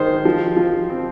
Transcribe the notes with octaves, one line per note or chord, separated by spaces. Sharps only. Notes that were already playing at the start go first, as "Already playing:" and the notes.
Already playing: D#3 G#3 C5
F3
F3
C4